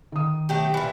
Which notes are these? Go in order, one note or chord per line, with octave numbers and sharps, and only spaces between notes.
D#3 D#6
F#3 A3 G4
A#2 E3